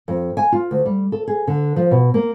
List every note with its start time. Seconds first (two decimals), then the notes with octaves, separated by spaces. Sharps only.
0.08 F2
0.37 G#5
0.52 F4
0.71 D2
0.86 G3
1.12 A4
1.28 G#4
1.47 D3
1.76 F3
1.91 B2
2.14 A#3